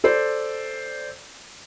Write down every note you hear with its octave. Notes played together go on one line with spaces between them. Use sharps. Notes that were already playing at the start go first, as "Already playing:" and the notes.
A4 C5 D5